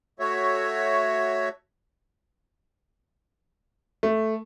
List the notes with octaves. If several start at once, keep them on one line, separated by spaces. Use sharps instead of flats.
A3 F#4 C#5 E5
A3